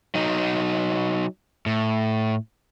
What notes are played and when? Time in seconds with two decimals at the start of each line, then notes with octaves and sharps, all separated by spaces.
0.15 F#3 D#4
1.66 A2